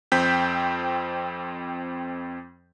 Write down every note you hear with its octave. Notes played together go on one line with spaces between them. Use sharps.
F2 C4 G5 G6 B6